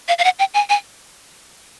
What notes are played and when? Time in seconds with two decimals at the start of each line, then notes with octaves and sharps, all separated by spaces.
0.08 F5
0.19 F5
0.24 F#5
0.39 G5
0.54 G#5
0.70 G#5